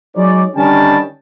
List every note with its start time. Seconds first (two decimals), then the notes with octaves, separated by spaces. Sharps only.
0.15 F#3 G#3 D#4 C#5 D5
0.56 D3 D#3 G3 C#4 G5 A5